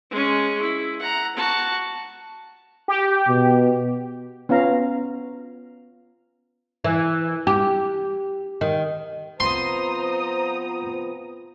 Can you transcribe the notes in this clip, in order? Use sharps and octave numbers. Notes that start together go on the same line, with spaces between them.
G#3 C#4
E4
F#5 A#5
F#4 A5
G4
B2
B3 C#4 F4 F5 A#5
E3
G4
D#3
F3 B3 C4 C5 A#5 C6 D#6